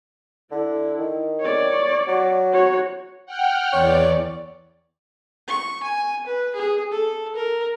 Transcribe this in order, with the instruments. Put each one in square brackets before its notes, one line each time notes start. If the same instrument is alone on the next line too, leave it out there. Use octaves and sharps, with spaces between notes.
[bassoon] D3 [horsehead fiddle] E4
[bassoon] D#3
[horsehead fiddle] C#5 D5
[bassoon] F#3
[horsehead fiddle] F#4 C#5
[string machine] F#5 G5 F6
[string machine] E2 D5 [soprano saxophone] C#5
[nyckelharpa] C#6
G#5
B4
G#4
A4
A#4